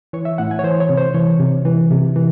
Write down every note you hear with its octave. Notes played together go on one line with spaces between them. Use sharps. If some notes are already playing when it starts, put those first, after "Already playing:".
E3 C#5
E5
A2 F#5
G#5
C#5
E3 C5
C#5
C3
C5
E3 C#5
C3
E3
C3
E3